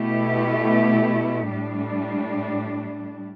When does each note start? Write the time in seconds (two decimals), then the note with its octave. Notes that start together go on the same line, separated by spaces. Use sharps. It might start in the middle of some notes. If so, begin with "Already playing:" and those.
Already playing: B2 A3 E4 G4
1.50 A2 G3 D4